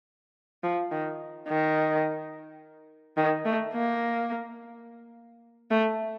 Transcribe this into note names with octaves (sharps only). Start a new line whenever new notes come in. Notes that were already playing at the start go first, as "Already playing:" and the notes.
F3
D#3
D#3
D#3
A3
A#3
A3